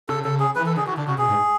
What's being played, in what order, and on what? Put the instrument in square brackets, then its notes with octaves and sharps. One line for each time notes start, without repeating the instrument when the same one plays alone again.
[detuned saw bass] C#3 [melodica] A4
[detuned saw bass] C#3 [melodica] A4
[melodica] G#4
[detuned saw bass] E3 [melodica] B4
[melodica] A4
[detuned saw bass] D3 [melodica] G#4
[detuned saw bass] E3 [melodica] F#4
[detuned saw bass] D3 [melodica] D4
[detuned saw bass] C#3 [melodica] F#4
[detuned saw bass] B2 [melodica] G#4
[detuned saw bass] G#2